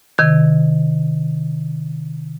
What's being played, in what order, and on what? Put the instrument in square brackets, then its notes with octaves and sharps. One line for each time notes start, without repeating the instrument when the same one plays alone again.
[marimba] C3 D#3 G#6